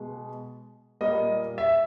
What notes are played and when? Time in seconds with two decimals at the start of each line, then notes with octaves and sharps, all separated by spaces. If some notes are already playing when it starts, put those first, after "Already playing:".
Already playing: B2 G#3
1.01 A#2 G3 A#3 D#5
1.58 E5